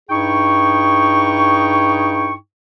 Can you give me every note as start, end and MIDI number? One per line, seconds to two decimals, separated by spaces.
0.10 2.34 43
0.10 2.34 63
0.10 2.34 64
0.10 2.34 68
0.10 2.34 79
0.10 2.34 85